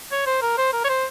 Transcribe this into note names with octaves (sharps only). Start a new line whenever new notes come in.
C#5
C5
A#4
C5
A#4
C#5
C5